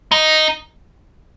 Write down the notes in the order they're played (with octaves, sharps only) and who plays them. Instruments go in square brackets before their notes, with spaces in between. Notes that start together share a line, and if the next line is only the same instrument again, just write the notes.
[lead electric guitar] D#4